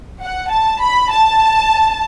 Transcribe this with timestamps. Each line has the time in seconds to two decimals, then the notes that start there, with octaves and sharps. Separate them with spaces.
0.22 F#5
0.51 A5
0.81 B5
1.10 A5